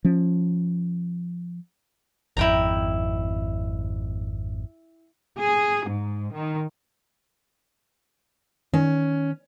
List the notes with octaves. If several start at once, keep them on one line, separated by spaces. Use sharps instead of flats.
F3 C#4
G#1 F2 E4 G5 A#5
G#4
G#2
D#3
D#3 C#4